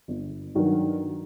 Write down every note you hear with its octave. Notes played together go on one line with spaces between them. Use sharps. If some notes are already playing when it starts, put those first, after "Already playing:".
G1
G2 D#3 F#3